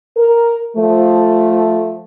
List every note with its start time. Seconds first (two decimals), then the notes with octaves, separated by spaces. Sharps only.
0.17 A#4
0.77 F3 A3